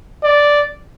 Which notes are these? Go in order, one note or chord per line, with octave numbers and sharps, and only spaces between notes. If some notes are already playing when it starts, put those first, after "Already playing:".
D5